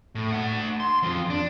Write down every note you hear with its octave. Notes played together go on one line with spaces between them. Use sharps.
A2
A3 F#5
C6
F2 F3
D4